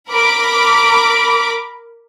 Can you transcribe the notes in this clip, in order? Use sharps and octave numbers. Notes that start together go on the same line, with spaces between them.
A#4 B5 D6